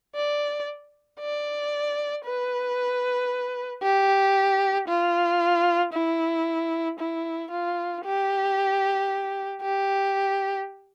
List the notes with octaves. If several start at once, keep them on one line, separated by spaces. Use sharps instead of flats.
D5
D5
B4
G4
F4
E4
E4
F4
G4
G4